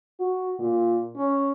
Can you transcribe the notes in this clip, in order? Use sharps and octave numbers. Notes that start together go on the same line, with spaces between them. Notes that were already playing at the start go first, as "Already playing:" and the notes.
F#4
A#2
C#4